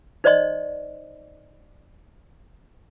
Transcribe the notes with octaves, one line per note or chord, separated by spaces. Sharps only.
D#4 C5 D5 D#5 C6